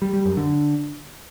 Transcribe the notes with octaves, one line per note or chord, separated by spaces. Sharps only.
G3
G3
F#2
D3